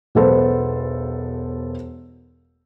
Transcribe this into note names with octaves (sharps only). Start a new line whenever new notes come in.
E1 B1 B3 A4 C5